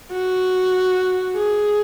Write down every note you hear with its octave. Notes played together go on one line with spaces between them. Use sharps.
F#4
G#4